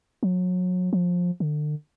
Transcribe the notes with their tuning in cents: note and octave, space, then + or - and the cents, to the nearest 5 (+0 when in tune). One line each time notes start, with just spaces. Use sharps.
F#3 -30
F3 +20
D3 +35